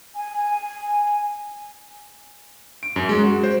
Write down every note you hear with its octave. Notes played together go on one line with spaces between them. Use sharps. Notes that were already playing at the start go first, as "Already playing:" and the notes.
G#5
D7
F#2
G#3
F#4
C5